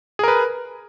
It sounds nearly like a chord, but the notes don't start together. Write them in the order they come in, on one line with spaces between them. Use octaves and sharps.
G#4 A#4 B4